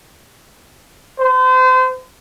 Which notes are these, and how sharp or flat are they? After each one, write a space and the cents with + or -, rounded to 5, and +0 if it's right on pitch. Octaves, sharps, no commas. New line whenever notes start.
C5 -35